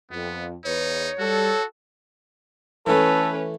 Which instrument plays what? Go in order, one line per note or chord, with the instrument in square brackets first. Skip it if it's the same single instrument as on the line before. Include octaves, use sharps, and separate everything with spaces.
[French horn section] F2 [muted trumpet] B3
[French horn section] E2 B4 [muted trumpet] D#4 [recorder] C#5
[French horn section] G3 [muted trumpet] F#4 [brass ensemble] A4
[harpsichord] E3 A3 [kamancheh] C#4 B4 [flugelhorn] A4